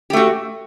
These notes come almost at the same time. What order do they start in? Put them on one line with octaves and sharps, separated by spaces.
G4 A3 F#4